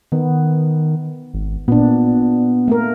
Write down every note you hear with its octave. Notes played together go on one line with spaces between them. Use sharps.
D#3 B3
G#1
A#2 B3 D4
A3 A#3 A#4